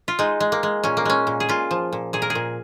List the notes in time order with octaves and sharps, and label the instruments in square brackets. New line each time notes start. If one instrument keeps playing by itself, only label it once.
[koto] F4
G#3 D#4
G#3
A#3
G#3
A#2 C#4
A#3
G#3 C#4
A#2
G#4
A#2 F4
F3
A#2
A#2 G#4
A#4
G#4
A#2